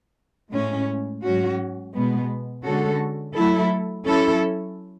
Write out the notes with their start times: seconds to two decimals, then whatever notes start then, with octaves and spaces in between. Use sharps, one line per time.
0.52 A2 G#3 C#4
1.23 G#2 F#3 C#4 F#4
1.93 B2 G#3 B3
2.64 D3 G#3 C#4 F#4 A4
3.35 F#3 A3 E4 A4
4.06 F#3 C#4 E4 A4